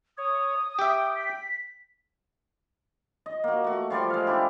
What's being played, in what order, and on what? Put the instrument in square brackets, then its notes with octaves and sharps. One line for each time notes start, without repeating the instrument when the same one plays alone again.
[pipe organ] C#5 [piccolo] D#6
[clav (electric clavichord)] G4 E5 [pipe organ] G5
[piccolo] B6
[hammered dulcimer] D#5
A#3 F#4
A3 F#4
F3 G3 D5 C6
G#3 F5
D4 E4 G4